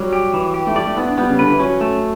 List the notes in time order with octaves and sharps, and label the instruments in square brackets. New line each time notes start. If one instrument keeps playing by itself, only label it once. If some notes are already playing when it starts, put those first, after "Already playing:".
Already playing: [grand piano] F#3 [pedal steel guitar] G3
[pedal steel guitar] G4
E3
G4
[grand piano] A3
[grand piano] G3 [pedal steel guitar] D5
[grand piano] A3
[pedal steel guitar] B3 [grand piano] E4
[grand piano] D4
[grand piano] G3 [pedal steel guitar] B3
[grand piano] C#3
[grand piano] D3 [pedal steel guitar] B4
[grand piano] E3
[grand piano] F#3 [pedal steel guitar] C#4
[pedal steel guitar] A3